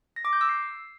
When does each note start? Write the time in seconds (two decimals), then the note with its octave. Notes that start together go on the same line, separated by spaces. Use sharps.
0.16 A#6
0.25 D6
0.33 G6
0.41 E6
0.49 C7